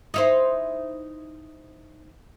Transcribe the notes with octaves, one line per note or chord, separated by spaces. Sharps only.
D#4 E4 C5